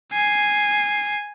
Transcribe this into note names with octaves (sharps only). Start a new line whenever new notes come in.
G#5 C7